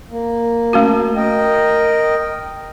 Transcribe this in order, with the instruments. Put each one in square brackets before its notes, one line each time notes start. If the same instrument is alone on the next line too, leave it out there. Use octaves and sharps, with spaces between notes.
[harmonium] A#3
[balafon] A3 C#4 F#4
[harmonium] A#4 D#5 G5